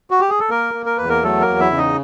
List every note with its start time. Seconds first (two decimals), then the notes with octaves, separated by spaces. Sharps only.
0.11 F#4
0.20 G4
0.30 G#4
0.40 A4
0.50 A#3 A#4
0.74 A#3
0.86 A#4
0.98 E2 B4
1.09 A#3 A#4
1.23 F#3 A3 A4
1.41 A#3 A#4
1.48 E2
1.60 E4 E5
1.71 C#3
1.77 D#4 D#5